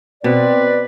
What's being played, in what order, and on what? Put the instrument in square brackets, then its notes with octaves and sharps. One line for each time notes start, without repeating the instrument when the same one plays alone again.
[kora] B2 [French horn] C4 [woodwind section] B4 D5